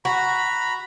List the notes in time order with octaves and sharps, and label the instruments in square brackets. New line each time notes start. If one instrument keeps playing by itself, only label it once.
[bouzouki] F#4 [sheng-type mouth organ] A#5 B5